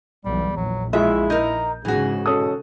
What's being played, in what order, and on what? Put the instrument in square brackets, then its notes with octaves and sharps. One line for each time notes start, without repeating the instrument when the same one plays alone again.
[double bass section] B1 E2 [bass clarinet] G3
[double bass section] A#1 [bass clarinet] F#3
[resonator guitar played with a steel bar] E2 E5 [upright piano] G#3 F4 G#4 [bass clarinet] E4
[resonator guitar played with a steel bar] D#4 A#4 [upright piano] G6
[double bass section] G#2 C#3 [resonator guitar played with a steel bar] E3 F#4 [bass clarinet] G#4
[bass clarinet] B2 [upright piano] C#4 A4 D#6